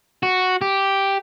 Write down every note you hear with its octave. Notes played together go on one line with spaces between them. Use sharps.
F#4
G4